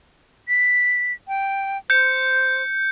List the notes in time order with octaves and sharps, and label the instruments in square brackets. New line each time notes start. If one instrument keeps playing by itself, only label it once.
[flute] B6
G5
[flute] C5 [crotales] G6 C#7